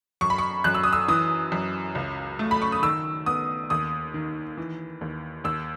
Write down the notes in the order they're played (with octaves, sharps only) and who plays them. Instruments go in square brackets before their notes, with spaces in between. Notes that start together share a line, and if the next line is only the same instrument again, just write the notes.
[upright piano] F#2 C#6
B5
C#6
F#2 F#6
E6
D#6
E6
E3 D#6
F#2
C#2
A3
B5
C#6
D#6
D#3 E6
B3 D#6
D#2 D#6
D#3
E3
D#2
D#2 E6